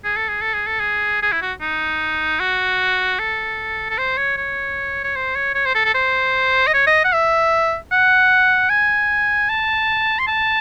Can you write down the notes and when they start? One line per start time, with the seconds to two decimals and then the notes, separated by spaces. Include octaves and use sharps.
0.04 G#4
0.17 A4
0.29 G#4
0.42 A4
0.54 G#4
0.67 A4
0.80 G#4
1.22 G#4
1.32 E4
1.42 F#4
1.61 D#4
2.40 F#4
3.19 A4
3.90 A4
3.98 C5
4.17 C#5
4.37 C#5
5.04 C#5
5.16 C5
5.36 C#5
5.55 C#5
5.66 C5
5.75 A4
5.85 A4
5.94 C5
6.67 D#5
6.74 C#5
6.87 D#5
7.04 F#5
7.13 E5
7.92 F#5
8.70 G#5
9.49 A5
10.19 C6
10.27 A5